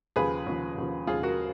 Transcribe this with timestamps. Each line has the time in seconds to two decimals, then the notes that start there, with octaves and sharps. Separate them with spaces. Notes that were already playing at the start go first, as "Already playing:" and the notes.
0.16 D#2 C#3 F3 G#4 B4
0.46 D#2 C#3 F3
0.78 D#2 C#3 F3
1.07 D#2 C#3 F3 F4 G#4
1.23 F#4 A#4